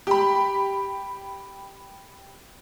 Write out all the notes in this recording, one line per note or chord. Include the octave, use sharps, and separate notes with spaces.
G4 B5